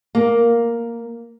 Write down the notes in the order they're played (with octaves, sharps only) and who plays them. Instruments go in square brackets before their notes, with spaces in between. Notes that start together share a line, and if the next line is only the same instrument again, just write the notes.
[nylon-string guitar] A#3